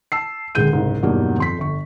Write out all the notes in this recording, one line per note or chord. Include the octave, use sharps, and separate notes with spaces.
A5 E6 C7
D#1 D2 G#3 G#4 G6 D#7
F#1 C2 G#2
E2 G2 B2 F#3 A#3 D#4
F2 C6 B6
G1 C#6